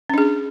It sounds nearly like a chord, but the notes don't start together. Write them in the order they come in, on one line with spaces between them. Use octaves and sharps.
C#4 D4 G#4